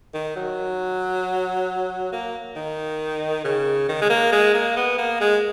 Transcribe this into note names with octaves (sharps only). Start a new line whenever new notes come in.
D#3
F#3
A#3
D#3
C#3
D#3
G#3
A#3
G#3
A#3
B3
A#3
G#3